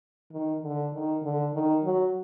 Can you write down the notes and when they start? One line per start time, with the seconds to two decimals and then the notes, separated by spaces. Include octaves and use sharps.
0.32 D#3
0.63 D3
0.93 D#3
1.23 D3
1.54 D#3
1.84 F#3